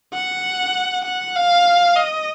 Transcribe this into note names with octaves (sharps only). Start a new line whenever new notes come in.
F#5
F#5
F5
D#5